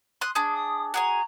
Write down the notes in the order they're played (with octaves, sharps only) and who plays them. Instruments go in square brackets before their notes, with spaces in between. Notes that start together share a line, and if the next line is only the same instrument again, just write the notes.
[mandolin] C6 D#6 F#6
D4 G#4
[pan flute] D#6
[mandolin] F#4 G#4 G#5 [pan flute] A#5